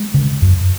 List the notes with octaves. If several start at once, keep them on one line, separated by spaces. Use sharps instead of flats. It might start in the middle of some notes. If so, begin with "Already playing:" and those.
Already playing: G#3
C#3
F#2